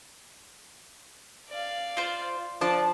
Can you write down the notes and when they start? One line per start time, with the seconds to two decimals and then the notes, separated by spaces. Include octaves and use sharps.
1.49 D5 F5
1.97 F4 C5
2.61 F3 D4 C5 A5